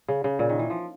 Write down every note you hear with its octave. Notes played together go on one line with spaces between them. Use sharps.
C#3
C#3
A#2
D#3
E3
F3